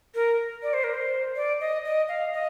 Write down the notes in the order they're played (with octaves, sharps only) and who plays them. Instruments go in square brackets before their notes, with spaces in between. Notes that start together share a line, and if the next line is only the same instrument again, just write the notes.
[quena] A#4
D5
C5
A#4
C5
D5
D#5
D#5
F5
D#5